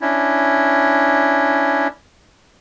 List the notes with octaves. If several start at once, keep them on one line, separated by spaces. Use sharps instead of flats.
C#4 D4 E4